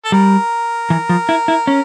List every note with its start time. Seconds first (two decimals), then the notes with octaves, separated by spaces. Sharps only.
0.05 A4
0.12 G3 A#4
0.90 E3
1.09 F3
1.29 E4
1.48 E4
1.67 C#4